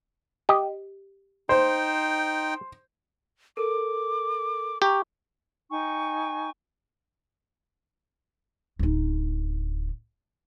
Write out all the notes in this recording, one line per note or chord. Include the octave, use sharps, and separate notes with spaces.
G4 D#5
D#4 C5 G5
A4 A#4 D6
G4 A#5 C#6
D#4 G5 G#5 C#6
D1 D#4